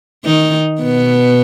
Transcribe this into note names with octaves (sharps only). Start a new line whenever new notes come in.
D#3 D#4
B2 B3